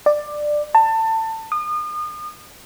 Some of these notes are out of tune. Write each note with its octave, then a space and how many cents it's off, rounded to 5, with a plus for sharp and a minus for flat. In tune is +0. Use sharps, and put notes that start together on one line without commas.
D5 +15
A5 +25
D#6 -35